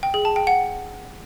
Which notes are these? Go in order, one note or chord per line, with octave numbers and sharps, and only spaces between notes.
G5
G#4
A5
G5
F#5